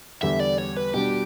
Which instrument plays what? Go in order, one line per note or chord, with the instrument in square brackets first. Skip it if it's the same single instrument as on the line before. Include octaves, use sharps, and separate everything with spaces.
[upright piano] E2 D3 G3 [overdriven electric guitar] E5
[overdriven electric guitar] D5
C#5
B4
[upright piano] B2 G3 D4 [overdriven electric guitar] G4